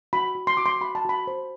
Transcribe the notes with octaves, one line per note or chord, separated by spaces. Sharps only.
F#4 B5
F#4
C6
F#4 D6
C6
F#4 B5
A5
F#4 B5
C5